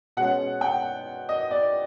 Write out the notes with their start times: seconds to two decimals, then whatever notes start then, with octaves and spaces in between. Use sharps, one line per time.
0.17 B2 G#3 C#4 F#5
0.61 G5
1.29 D#5
1.51 D5